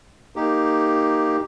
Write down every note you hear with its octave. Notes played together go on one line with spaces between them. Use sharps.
A#3 D#4 G4